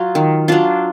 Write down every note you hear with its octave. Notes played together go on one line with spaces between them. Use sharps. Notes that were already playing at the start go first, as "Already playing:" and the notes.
Already playing: F#3 F4
D#3
F#3 D4 F4